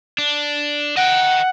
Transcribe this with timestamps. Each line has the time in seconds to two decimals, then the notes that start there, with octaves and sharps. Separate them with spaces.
0.18 D4
0.97 D#5 F#5 G5